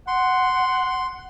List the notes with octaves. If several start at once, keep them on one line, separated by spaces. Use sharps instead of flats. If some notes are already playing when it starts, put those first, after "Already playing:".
F#5 C6